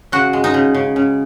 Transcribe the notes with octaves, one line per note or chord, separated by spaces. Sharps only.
C#3 F#4
G#3
D#4
C#3
C#3
C#3